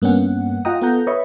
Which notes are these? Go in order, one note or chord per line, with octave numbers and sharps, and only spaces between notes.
G2 A#3 B3 C#4 F#5
F4 D#5 F#5 G5 A#5 D#6
B3 F4 A4 F#5 A#5 G6
B4 C#5 D#5 E5 B5 C#6